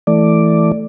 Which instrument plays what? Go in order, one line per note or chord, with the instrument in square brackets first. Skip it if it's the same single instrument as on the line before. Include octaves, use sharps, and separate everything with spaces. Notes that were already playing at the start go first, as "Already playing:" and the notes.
[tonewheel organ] E3 A3 D5